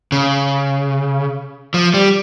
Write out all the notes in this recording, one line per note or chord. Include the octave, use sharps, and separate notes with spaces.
C#3
F3
G3